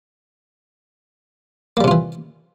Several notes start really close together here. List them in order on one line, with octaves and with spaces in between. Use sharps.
A#3 G3 C3 F4 E3